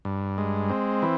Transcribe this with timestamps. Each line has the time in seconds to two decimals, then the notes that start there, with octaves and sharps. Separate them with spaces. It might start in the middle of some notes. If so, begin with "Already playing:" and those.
0.05 G2
0.38 G#3
0.70 C4
1.02 E3